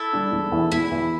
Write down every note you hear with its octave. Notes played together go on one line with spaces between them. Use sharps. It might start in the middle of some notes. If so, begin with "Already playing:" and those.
Already playing: E4 A4
G3 D4
E1
E2 E3
E1 E4
E2 E3